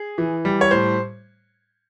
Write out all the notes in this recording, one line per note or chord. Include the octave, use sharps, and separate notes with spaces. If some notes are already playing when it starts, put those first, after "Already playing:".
Already playing: G#4
E3
G3
C#5
A2 C5